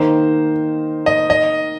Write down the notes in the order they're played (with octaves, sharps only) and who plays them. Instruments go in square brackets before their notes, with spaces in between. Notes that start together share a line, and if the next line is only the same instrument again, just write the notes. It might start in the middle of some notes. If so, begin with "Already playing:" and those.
Already playing: [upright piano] D#3 A#3 D#4 [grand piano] C5
[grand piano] D#5
D#5